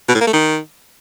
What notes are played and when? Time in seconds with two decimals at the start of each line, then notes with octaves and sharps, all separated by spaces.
0.09 B2
0.15 A2
0.21 A#3
0.27 A3
0.33 D#3